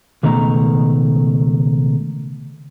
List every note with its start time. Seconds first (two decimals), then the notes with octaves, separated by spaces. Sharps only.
0.23 C#2 B2 D#3 A3 A#5